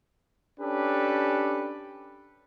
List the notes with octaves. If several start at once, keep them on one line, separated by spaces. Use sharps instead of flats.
C#4 D4 G4 A4 B4